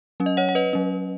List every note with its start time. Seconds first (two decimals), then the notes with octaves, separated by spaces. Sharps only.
0.20 F#3 C#4
0.26 D#5
0.37 C#5 F#5
0.49 F#5
0.55 B4 D#5
0.73 F#3 C#4